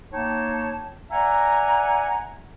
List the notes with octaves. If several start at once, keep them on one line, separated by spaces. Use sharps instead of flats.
A#3 D#4 C#5 G5 A5
D5 E5 F#5 G#5 A#5